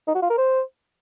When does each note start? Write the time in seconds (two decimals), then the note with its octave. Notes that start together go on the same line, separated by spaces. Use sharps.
0.07 D#4
0.15 F#4
0.23 F4
0.30 A#4
0.38 C5